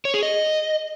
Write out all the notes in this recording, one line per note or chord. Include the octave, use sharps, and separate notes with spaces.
C#5
G#4
D#5